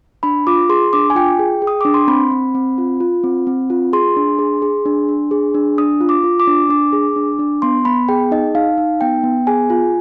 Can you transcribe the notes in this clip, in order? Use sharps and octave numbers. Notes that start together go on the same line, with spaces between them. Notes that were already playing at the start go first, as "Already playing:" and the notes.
D4 B5
F4 D6
G#4 C6
D4 D6
G#5
F4 G5
G#4
G#4
D#6
D4 D6
C6
C4 B5
C4
C4
F4
F4
C4
C4
F4
G#4 C6
D4
G#4
G#4
D4
D4
G#4
D4
D4 D#6
F4
D6
F4
D6
D4
D4 D6
G#4
D4
D4
B3 C6
B3 B5
G#4 G5
D#4 D#5
D#4 F5
D#4
B3 G5
B3
G#4 G#5
F4